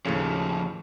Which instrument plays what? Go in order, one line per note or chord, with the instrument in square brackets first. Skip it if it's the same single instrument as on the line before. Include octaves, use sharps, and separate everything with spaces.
[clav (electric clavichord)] D#2 A2 C#3 [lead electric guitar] F3 A3